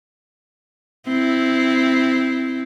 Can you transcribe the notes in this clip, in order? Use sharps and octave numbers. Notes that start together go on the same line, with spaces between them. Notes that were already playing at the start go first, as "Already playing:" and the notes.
C4 E4